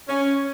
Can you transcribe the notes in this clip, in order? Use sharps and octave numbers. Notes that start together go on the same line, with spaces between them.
C#4